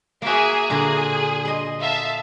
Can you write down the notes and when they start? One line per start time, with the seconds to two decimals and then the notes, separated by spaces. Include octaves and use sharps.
0.22 A#3 F#4 G#4 E5
0.70 A#2 D3 G#4 A#5
1.45 D#5 C6
1.80 E5 F5 A5